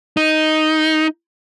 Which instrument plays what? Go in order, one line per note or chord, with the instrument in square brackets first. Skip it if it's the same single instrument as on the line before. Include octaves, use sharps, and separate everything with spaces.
[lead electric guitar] D#4